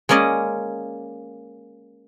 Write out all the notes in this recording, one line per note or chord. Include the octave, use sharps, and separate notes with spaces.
G#3 A#3 C#4 D5 D#5